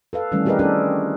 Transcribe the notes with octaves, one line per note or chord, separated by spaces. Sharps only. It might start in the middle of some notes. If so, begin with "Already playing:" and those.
A4 B4 F5
D#3 E3 G3 A3 C#4
C4 G4 G#4 A#4 B4 D#5
C#4 D4 G4 A4 A#4